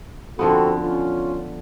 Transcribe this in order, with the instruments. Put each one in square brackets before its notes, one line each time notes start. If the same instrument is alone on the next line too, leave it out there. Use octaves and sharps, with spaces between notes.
[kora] D3 F3 B3 [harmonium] C4 F#4 A4
[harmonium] C#4 F4